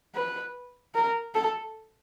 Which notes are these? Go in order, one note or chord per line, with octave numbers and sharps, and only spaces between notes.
B4
A#4
A4